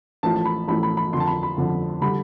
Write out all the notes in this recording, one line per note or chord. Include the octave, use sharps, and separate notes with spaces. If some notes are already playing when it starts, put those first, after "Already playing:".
A1 A2 F3 A3 A5
A5
B5
A1 A2 F3 A3 B5
B5
B5
F2 D3 F3 C6
A5
B5
B5
F2 D3 F3
D3 G3 B5